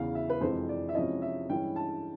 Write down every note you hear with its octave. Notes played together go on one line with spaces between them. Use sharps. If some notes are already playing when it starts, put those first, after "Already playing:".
Already playing: E2 C#3 E3 F5
E5
B4
F2 C3 E3 G#3 C4 C5
D5
E5
C3 F3 G#3 C#4 E4 D#5
E5
G2 E3 G#3 C#4 E4 G5
A5